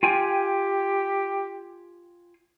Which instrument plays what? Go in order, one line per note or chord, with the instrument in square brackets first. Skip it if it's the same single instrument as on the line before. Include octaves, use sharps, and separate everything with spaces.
[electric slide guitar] F4 G5 G#5 [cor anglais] G4